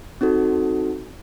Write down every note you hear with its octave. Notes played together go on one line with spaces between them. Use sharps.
C4 D#4 F#4 A4